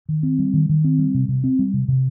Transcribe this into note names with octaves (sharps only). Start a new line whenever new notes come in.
D#3
C4
G3
D#3
D#3
C4
G3
C3
C3
C4
G3
C3
C3